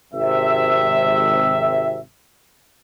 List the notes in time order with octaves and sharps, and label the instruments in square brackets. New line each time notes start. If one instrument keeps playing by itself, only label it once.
[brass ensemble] G#1 C3 E5